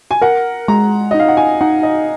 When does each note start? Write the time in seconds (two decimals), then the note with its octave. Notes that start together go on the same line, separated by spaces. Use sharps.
0.11 G#5
0.21 A#4 F#5
0.68 G#3 A#5
1.11 D#4 D#5
1.20 F5
1.28 F#5
1.37 G#5
1.61 D#4 F#5
1.83 D#5